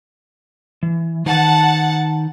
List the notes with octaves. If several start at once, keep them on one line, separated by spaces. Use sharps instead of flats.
E3
D#3 D#4 B4 F#5 A5